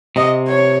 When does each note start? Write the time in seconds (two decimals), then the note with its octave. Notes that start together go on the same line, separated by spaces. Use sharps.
0.16 C3 D#5
0.48 C#5